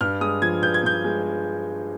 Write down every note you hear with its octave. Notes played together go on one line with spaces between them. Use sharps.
G2 F6
G#3 D#6
F3 G#6
G2 G6
G#6
G2 G6
G#3